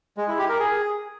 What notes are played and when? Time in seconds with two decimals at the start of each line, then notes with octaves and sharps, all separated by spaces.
0.17 G#3
0.28 E4
0.38 G4
0.49 A#4
0.59 G#4